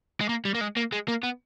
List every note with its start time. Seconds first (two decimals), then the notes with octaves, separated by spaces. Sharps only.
0.21 G#3
0.29 A#3
0.45 G3
0.54 A#3
0.61 G#3
0.76 A#3
0.92 G#3
1.08 A#3
1.23 B3